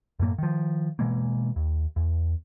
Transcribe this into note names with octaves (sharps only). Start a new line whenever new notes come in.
F#2 A2 A#3
D#3 F3
B2 E3 G#3 A#3
D#2
E2